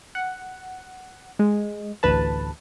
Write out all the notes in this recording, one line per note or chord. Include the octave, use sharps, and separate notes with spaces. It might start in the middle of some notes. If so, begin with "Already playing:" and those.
F#5
G#3
A1 D2 B4 A5